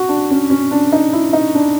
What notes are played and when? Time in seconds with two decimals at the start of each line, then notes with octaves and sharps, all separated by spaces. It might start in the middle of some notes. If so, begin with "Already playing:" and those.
Already playing: F#4
0.09 D4
0.30 C#4
0.50 C#4
0.71 D4
0.92 D#4
1.13 E4
1.33 D#4
1.55 D4